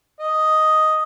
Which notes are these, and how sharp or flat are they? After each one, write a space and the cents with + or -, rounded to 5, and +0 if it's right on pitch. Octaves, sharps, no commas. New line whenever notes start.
D#5 +5